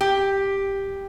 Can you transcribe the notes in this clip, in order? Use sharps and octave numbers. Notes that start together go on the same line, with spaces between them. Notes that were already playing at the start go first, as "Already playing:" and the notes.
G4